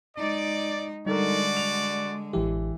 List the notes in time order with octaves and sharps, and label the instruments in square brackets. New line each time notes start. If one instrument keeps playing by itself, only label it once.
[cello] G#3 D#4 [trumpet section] D5
[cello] D3 G#3 [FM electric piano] G3 [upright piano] D#4 A4 A#4 [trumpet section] F#4 D5
[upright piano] F7
[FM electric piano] A1 G4 [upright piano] E3